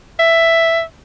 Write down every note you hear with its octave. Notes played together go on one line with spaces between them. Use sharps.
E5